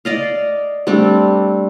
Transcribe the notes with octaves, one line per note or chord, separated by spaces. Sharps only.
D5 D#5 F5
G3 A3 C4 D4